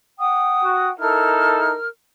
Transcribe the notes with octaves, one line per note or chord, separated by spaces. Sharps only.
F#5 G5 D#6
F#4
D#4 E4 A4 A#4 F6